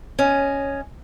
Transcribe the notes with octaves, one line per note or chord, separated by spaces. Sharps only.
C#4 D#5